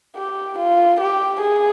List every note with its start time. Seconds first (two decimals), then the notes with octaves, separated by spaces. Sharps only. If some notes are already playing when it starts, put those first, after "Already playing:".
0.16 G4
0.58 F4
1.00 G4
1.42 G#4